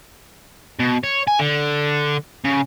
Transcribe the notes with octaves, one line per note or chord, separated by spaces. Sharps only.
B2
C#5
G#5
D3
C#3